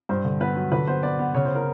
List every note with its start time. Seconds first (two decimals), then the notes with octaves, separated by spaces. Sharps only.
0.09 G2 C5
0.25 D3
0.40 B3 B4
0.56 F#3
0.72 D3 B4
0.87 B3 C5
1.03 B3 D5
1.19 B3
1.34 C#3 C#5
1.45 C5
1.55 A#4